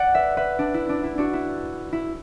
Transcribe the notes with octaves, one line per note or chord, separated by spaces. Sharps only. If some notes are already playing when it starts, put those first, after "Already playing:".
Already playing: D5 F#5
B4 E5
B4 E5
D4
E4
D4
E4
D4 F#4
E4
E4